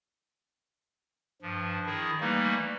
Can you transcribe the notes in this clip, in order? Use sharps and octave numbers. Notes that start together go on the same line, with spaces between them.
G2 F3
D#3 E4 G#4
E3 G3 A3 A#3 D#4